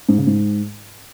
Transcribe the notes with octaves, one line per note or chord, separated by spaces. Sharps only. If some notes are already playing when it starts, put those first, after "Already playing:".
G#2
C#3
G#2